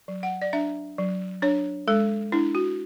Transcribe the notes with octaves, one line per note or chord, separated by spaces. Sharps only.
F#3
F#5
D5
D4 E5
F#3
D4 C#5
G#3 A4
D4 E4
F#4